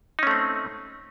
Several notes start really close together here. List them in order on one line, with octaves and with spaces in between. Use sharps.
D#4 C#4 A3 C4